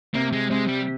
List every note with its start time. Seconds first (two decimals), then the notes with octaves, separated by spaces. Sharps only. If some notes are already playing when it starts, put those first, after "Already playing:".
0.14 C3 A#3
0.33 G#3
0.50 C3 G#3
0.67 G3